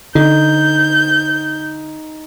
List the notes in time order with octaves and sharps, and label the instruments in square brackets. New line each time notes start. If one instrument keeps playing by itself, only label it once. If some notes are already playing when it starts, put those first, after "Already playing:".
[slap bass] D3 [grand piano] D#4 [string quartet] G6